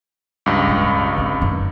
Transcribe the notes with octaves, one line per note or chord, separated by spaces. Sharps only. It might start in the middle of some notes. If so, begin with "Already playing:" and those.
C#2 G2
D1 F4
D3 C4
F#2 D#3